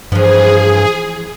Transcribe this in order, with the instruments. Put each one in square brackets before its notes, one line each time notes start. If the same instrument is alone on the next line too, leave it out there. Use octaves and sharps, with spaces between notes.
[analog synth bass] G2 [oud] E3 F3 [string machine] G#4